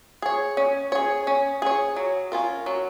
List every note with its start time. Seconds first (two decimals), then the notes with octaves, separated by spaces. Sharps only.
0.22 G#4 C#5
0.57 C#4
0.92 G#4 C#5
1.27 C#4
1.62 G#4 C#5
1.96 F#3
2.32 C#4 F4 A#4
2.66 F#3